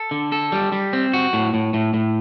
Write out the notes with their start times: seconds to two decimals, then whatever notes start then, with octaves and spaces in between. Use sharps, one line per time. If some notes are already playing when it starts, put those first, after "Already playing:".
Already playing: A4
0.11 D3
0.32 A4
0.52 G3
0.72 G3
0.93 C4
1.14 F#4
1.33 A2
1.54 A2
1.74 A2
1.94 A2